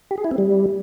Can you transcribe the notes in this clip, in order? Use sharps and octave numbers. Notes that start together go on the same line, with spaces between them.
G4
G#4
E4
C4
G3